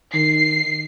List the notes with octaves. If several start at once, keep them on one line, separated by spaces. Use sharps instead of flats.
D#3 C7